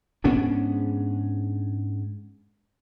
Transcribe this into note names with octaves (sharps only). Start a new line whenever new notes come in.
G#2 B3 C#4 D4